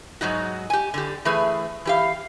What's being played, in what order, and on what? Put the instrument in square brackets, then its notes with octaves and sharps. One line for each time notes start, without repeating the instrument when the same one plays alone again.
[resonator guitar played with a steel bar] G#2 F#3 D#4 F#4
G4 G#5
D3 G4
E3 A3 G#4 B4
E3 G4 F5